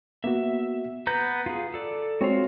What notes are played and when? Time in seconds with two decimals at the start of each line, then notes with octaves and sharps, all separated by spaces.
0.24 A#3 B3 F#4 E5
1.07 B3 B4 A#5 G6
1.46 F4 G#4
1.74 A4 D5
2.21 G#3 C4 F4 F#4 C#5